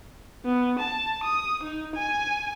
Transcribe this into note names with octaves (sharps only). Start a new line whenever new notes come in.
B3
A5
D#6
D#4
G#5